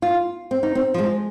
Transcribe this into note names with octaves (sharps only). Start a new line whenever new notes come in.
F4
C4
D#4
C4
F3
G#3